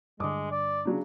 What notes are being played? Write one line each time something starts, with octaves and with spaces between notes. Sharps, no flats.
G2 D3 G#3 D6 D#6
D5
C#3 F#3 D4